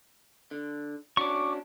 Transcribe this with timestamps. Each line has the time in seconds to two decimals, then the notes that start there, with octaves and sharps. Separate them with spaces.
0.51 D3
1.17 C#4 D4 F#4 C#6 D6